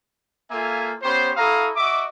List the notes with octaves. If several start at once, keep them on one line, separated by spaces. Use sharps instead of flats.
A#3 F4 A4 E5 G#5
B3 C#4 G4 C5
E4 F#4 A4 F5 A#5 D#6
F#4 D#5 E5 D6